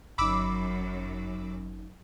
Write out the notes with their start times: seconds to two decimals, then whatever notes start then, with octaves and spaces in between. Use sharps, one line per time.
0.18 G1 F#2 D#4 B5 D6 E6